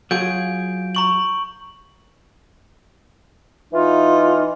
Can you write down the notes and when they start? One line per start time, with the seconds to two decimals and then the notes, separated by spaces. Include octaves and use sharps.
0.11 F#3 F4 G#4 G6 D7
0.95 A#5 C#6 F#7
3.73 E3 D#4 F4